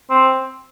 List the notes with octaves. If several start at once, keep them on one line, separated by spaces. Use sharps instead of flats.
C4